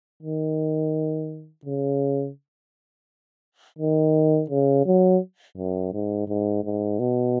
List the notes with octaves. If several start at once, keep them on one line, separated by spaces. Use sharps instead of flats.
D#3
C#3
D#3
C#3
F#3
F#2
G#2
G#2
G#2
B2